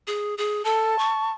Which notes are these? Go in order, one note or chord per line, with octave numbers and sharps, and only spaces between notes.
G#4
G#4
A4 A5
C#6